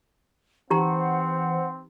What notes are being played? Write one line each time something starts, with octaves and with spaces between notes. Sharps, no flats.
E3 C4 D#4 G4 C5 F#5 A#5